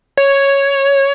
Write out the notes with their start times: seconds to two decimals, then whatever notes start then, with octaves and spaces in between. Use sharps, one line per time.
0.18 C#5